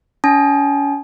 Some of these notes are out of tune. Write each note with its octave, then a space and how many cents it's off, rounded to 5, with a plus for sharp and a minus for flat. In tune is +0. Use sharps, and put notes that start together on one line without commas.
C#4 +30 A5 -45